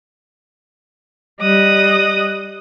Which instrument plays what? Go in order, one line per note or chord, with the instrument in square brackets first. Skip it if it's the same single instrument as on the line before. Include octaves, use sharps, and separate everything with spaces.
[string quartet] G3 D#5 D#6 F#6